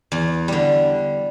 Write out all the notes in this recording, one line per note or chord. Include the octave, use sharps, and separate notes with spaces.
E2
D3 G3